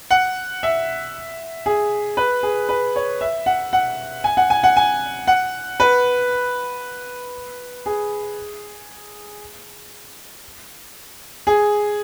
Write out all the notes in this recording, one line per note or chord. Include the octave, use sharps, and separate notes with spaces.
F#5
E5
G#4
B4
G#4
B4
C#5
E5
F#5
F#5
G#5
F#5
G#5
F#5
G#5
F#5
B4
G#4
G#4